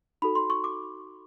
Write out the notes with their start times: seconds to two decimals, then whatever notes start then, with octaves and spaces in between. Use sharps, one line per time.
0.22 D#4 F#4 A4 B5
0.35 C6
0.50 C#6
0.64 D6